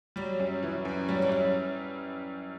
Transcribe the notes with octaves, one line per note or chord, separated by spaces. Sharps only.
F#3 G3
F#2
E3
F#2
F#3 G3
E3
F#2 F#3